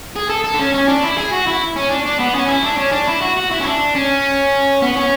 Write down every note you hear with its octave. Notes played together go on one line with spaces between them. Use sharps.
G#4
A4
A4
D4
C#4
C#4
D4
E4
G#4
F#4
E4
C#4
D4
D4
B3
C#4
E4
D4
C#4
D4
E4
F#4
F#4
E4
C#4
D4
C#4
B3
C#4